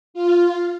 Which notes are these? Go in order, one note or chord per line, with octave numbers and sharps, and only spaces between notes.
F4